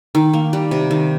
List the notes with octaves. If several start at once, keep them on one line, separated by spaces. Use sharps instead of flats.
D#3
A#3
G3
C3
D#3